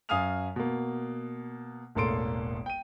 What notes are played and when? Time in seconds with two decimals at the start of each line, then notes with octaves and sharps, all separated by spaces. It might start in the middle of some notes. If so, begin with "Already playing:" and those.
0.09 F#2 F5 G#5 D#6 F6 F7
0.56 B2 A#3
1.95 E1 A1 A#3 A4 C6 D7
2.66 G5 D#7